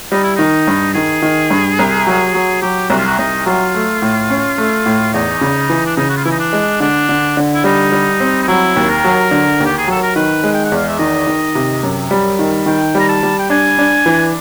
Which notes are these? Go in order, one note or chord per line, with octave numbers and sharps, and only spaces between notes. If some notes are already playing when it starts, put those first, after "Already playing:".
G3 D#4
E4
D#3 D#4
G2
D#3 G#4
D#3
G2
C2
F#3
F#3
F#3 G4
C2 F#4
F4
F#4
C2 D#4
F#3 F4
A3
A2
C#4
A3
A2
E2 D#4
C#3
E3
D4
C#3 D#4
F#4
F4
E3 E4
D#4
D4
G#3
D3 D4
D3
D3
E4
G3 D#4
G3
C4
D#4
F#3 E4
D#2
A#4
F#3
D3
D#2
G4
G#4
F#3 A4
A#4
D#3 B4
G#3
G5
F#5
E2 F5
E5
D#3 D#5
D#3
C3
F#2
G3
D#3
D#3 G5
G3 A#5
A5
G3
G5
D4 G#5
D4
E3